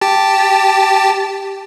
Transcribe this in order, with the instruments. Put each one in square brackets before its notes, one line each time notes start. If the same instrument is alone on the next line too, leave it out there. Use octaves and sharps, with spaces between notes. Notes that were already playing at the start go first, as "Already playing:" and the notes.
[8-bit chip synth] G4 A5